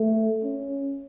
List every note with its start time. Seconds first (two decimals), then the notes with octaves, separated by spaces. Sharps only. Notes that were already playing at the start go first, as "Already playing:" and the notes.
Already playing: A3
0.44 C#4